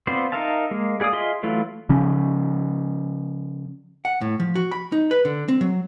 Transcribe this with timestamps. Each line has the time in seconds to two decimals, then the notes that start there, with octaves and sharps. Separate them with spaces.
0.07 B3 C4 F4 C5 D5
0.32 D#4 A#4 E5 F5 A5
0.71 G#3 A#3
1.00 B3 G#4 D5 F5 D#6
1.13 F4 G#4 D#5 E5 C6
1.43 E3 F#3 A3 E4 F4
1.89 C#3 F3 C#4
4.05 F#5
4.21 A2
4.40 F3
4.55 F#4
4.71 B5
4.92 D#4
5.11 B4
5.25 D3
5.48 C4
5.61 F#3